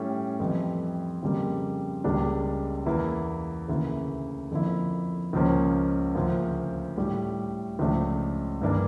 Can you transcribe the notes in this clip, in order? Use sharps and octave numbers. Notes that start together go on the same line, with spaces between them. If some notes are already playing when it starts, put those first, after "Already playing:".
Already playing: A2 G3 C#4
F2 E3 G3
F2 C#3 G3 A#3
C#2 C#3 G3 A#3 D4
E2 E3 A#3 E4
D2 C#3 E3 A#3 E4
F2 D3 F3 A#3 E4
C#2 C#3 F3 A#3 C#4
D2 C#3 F3 A#3
A2 G3 D4
C#2 C#3 F3 A3 D4
G2 E3 A#3 D4